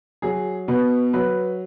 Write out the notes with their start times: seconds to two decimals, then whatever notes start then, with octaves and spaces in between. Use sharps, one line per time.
0.22 F#3 G#4
0.68 B2 B4
1.13 F#3 B4